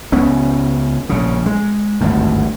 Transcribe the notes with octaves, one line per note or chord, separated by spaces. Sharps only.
C#2 C#3 B3 C#4
A#1 C#3
G#3
G#1 D2 G2